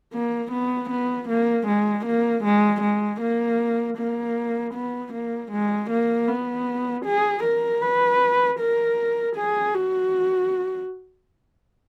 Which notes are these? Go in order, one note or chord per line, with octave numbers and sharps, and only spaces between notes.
A#3
B3
B3
A#3
G#3
A#3
G#3
G#3
A#3
A#3
B3
A#3
G#3
A#3
B3
G#4
A#4
B4
A#4
G#4
F#4